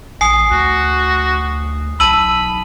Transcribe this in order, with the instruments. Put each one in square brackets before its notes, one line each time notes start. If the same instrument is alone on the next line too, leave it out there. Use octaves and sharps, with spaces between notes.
[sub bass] A#1 [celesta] G#5 [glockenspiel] D#6 C7
[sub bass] D2 [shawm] F#4
[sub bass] B1 [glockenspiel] A5 D#7 F#7 [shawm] B5 [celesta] E6